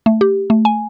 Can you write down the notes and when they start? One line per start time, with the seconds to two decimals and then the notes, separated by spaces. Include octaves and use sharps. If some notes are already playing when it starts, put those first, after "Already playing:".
0.06 A3
0.21 G4
0.50 A3
0.65 G#5